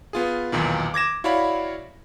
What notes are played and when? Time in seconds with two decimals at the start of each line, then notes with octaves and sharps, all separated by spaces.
0.13 B3 F4 G#4
0.52 B1 E2 A#2 D#3
0.94 D6 G#6 A#6 E7
1.24 E4 F#4 C#5 D5 F5 B5